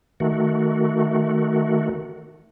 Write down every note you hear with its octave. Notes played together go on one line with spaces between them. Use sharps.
D#3 A3 F#4